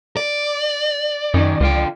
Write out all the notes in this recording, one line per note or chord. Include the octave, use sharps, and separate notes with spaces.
D5
F#2 D#3 C#4 D#4
C#2 D3 F4 G5